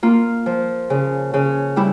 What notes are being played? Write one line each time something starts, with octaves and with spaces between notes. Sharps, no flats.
A#3 F4
F3
C#3
C#3
G3 E4